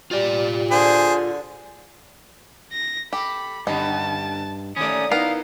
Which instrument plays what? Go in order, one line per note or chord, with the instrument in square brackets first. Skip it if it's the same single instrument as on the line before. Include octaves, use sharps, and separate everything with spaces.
[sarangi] G3 [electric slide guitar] F4 D5
[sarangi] D3 [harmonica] G#4 C5
[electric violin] A#6
[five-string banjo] G4 [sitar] A4 [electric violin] B5
[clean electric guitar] G2 [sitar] D3 B3 C#4 [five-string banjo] D#4 [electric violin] A5
[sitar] D#3 A#3 D5 [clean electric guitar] A3 C#4 [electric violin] D#6
[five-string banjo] B3 A#4 [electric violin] D#4 E4 [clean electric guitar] F5